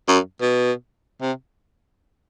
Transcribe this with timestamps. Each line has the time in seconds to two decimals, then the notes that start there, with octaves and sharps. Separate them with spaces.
0.08 F#2
0.42 B2
1.21 C3